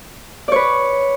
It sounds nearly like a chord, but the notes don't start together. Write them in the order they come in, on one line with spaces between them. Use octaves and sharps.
D5 C#5 B4